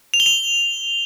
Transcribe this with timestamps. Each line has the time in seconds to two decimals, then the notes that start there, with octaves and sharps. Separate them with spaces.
0.14 F7
0.20 G7
0.26 F7